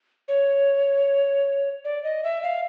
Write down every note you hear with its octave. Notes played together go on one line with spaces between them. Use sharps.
C#5
D5
D#5
E5
F5